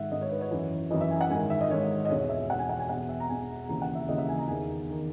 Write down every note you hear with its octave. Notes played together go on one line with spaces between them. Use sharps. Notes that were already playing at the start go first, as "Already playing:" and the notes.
Already playing: G#2 D#3 E5 F#5
G#2 D#3 D#5
C#5
B4
C#5
F#2 E3
F#2 E3 D#5
E5
G#5
F#5
G#2 D#3 G#5
E5
D#5
G#2 D#3 C#5
D#5
E2 B2 C#5
E5
E2 B2 F#5
G#5
F#5
G#5
E2 B2 F#5
E5
A#5
E2 B2 G#5
D#2 C#3 E3 A#5
F#5
E5
D#2 C#3 E3 D#5
E5
G#5
A#5
E2 D#3 G#5
D#3